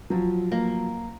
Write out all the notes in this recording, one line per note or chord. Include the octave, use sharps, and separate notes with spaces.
F3 F#3
A#3